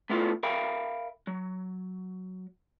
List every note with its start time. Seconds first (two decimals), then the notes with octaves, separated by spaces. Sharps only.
0.10 A3 B3 E4 F4 A4
0.43 A#4 E5 F5 G5 B5
1.27 F#3